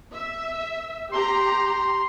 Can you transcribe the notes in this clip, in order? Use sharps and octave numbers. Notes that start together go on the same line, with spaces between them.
E5
G4 A#5 C6